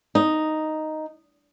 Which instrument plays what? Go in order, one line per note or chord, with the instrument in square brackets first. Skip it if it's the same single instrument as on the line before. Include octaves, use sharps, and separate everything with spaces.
[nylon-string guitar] D#4